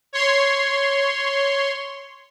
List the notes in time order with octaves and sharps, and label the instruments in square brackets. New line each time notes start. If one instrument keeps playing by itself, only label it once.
[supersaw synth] C#5 C6